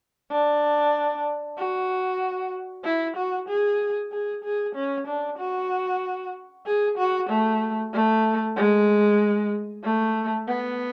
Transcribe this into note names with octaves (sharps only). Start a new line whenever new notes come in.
D4
F#4
E4
F#4
G#4
G#4
G#4
C#4
D4
F#4
G#4
F#4
A3
A3
G#3
A3
B3